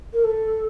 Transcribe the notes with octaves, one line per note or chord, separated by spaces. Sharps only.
A#4
A4